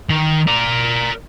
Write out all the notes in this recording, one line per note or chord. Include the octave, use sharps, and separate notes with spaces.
D#3
A#4 D5